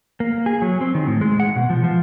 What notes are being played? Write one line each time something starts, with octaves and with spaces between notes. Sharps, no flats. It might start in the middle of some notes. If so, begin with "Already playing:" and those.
A#3
G#4
F#3
C4
D#3
A2
G#3
F#5
B2
F3
F3